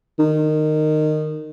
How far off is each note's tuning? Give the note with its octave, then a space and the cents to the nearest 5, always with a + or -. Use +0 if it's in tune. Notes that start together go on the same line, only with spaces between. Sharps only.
D#3 -20